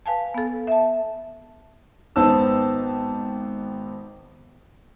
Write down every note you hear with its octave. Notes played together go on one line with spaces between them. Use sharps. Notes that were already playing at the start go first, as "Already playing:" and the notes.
B4 F5 G#5 A5
B3 A4
E5 A5
G#1 B3 D#4 C5 A5 E6